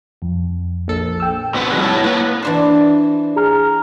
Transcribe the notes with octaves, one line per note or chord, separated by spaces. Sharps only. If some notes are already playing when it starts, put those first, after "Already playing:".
F2
A#1 A4
G5 E6
B2 C4 B4 F#5
F2 B2 G3 G#3
E4 C#5 A5
A#3 B4
E3 D4 C5
G#4 A#5 F6